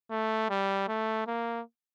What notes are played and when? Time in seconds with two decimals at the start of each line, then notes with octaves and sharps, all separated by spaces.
0.11 A3
0.50 G3
0.88 A3
1.27 A#3